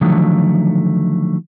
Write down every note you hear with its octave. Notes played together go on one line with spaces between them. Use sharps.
D3 D#3 F3 F#3 A3